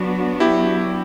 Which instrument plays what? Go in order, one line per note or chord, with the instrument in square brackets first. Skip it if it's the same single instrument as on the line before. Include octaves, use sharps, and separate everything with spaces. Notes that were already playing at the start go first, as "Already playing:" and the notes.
Already playing: [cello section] F#3 B3 D4 F#4
[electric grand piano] E4 G4